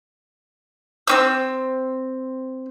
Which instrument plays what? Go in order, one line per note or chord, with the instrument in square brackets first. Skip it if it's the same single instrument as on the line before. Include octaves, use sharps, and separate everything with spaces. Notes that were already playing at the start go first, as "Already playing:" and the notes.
[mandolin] C4 C#4 E6